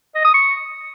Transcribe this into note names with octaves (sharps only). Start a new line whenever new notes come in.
D#5
D#6
C#6